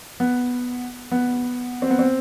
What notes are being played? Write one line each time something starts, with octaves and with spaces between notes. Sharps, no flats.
B3
B3
C4
B3
C4